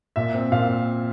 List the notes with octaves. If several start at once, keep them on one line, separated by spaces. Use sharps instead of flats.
A#2 E5
C4
A#2 F5